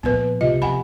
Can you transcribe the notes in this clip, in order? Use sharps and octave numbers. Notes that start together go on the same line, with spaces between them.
A#2 F3 B3 B4
C#2 C3 F4 D#5
F2 F#5 G#5 B5